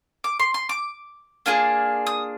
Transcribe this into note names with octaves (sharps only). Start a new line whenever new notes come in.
D6
C6
C6
D6
A#3 D4 F4 G#4
D#6